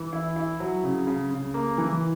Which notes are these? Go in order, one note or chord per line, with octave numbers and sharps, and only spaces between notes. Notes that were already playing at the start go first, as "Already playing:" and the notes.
Already playing: E3
E4
E4
F#3
C#3
C#3
C#3
A#3
E3